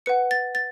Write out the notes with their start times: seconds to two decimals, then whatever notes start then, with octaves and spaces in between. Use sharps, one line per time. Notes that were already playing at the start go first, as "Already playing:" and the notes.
0.06 B4 F#5 C#7
0.31 A6
0.55 A6